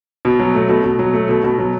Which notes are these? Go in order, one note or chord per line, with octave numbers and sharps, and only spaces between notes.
B2
F#3
A3
B2
B2
F#3
A3
B2
B2
F#3